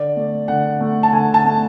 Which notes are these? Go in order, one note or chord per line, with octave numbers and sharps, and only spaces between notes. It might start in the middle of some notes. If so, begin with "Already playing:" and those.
Already playing: D3 D5
A3
D3 F#5
A3
A5
D3 G#5
A5
A3